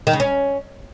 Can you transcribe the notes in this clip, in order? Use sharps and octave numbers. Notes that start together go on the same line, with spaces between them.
D#3
C#3
C#4